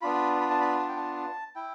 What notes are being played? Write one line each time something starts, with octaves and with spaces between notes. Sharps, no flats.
B3 D4 F4 B5
B5
A5
B5
A5
G5
A5
A5
E4 G5